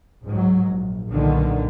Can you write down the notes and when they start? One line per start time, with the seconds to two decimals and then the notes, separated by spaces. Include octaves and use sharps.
0.25 C#2 G#2 F#3
0.62 A#1
1.11 B1 A#2 D3 D#3